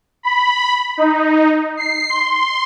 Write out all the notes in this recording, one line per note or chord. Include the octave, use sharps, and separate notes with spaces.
B5
D#4
C7
C6